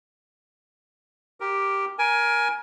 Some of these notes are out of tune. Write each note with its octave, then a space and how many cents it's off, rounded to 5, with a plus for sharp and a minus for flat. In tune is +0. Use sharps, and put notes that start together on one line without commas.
G4 +0 A#4 +5
A#4 +20 G#5 +10